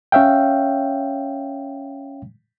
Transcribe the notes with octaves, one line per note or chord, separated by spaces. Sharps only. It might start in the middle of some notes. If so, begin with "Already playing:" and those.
C#4 C#5 E5 F5 G5